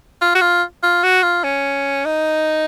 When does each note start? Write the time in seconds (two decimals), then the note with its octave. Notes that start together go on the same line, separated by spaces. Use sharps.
0.21 F4
0.35 F#4
0.41 F4
0.83 F4
1.03 F#4
1.23 F4
1.44 C#4
2.05 D#4